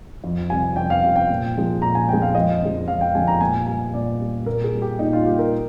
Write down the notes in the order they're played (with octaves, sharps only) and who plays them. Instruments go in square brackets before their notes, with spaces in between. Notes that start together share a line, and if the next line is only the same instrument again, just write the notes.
[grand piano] F2
C3 G3 G#5
F2 G5
F5
C3 G3
G5
A#2
F3 G#3
A#2 A#5
G#5
F3 G#3 G5
F5
F2 D#5
D3 F3 G#3
F2 F5
G5
D3 F3 G#3 G#5
A#5
A#2 G#5
G3 G#5
A#2 D5
G3
A#2 A#4
G#4
G3
G4
A#2 D#4
F4
G3 G4
A#4